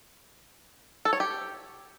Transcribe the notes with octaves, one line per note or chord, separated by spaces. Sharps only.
A4
C#5
G4